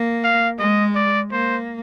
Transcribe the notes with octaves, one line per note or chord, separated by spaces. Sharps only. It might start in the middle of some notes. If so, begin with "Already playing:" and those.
Already playing: A#3
F5
G#3 D#5
D5
A#3 C5